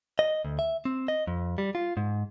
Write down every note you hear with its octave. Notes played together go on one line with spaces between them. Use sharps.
D#5
D2
E5
C4
D#5
F2
G3
F4
G#2